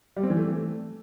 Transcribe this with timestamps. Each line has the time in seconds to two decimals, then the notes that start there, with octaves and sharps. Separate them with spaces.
0.16 G3
0.23 C4
0.30 E3
0.37 A3